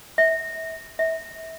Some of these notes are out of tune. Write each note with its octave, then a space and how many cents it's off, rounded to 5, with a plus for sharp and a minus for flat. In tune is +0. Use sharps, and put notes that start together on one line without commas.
E5 -30
E5 -30